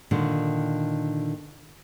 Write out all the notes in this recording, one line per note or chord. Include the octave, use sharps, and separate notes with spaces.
A#2 D3 D#3